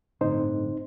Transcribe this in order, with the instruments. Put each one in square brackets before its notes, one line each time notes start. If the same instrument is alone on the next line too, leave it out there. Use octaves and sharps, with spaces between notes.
[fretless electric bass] G1 A2 D3 [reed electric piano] C4 D#4 C5